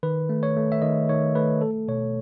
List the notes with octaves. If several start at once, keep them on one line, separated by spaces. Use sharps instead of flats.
D#3 B4
A3
C#5
A3
E5
D#3 D#5
D#3 C#5
A3 B4
A3 A4
B2 C#5